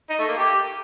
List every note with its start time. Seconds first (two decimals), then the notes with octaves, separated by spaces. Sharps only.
0.10 D#4
0.19 A3
0.28 A#3
0.37 G4